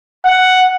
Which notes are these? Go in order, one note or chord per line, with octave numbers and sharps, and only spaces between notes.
F#5